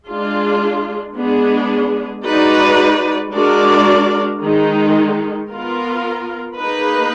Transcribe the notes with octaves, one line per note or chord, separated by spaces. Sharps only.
G#3 D4 F4 G#4
G#3 B3 D4 G#4
G#3 D#4 F#4 B4 D5
G#3 D4 F#4 A#4 D5
D#3 G#3 D#4
B3 F4 A#4
A#3 D#4 G#4 B4